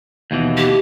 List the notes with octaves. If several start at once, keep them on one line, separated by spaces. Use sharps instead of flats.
D#2 B2 E3
G4